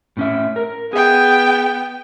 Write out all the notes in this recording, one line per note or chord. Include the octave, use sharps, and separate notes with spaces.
A2 C#4 E5
A#4
B3 G#4 G5